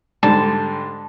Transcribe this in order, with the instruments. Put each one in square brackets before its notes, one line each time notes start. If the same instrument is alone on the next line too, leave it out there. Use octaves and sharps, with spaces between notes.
[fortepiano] G#2 D3 G3 [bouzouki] A5